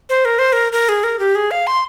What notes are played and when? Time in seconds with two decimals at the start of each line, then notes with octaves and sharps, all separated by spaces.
0.09 C5
0.25 A#4
0.39 C5
0.52 A#4
0.72 A#4
0.89 G#4
1.03 A#4
1.19 G4
1.35 G#4
1.51 F5
1.67 C6